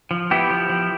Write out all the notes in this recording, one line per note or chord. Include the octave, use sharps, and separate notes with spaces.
F3
B3 E4 G4
F3
F3